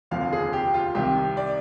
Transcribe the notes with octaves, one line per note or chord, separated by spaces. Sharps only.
F1 D#2 D3 F3 F5
G#4
G4
F4
C2 C3 D#3 G4
D5